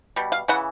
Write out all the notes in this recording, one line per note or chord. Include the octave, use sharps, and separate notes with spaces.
B2 G3
F5
C#3 E3 F#5